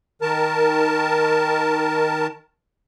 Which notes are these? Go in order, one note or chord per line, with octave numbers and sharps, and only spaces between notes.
D#3 A#4 A5